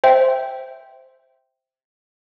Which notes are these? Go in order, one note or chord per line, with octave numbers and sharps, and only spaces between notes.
C5 E5 G5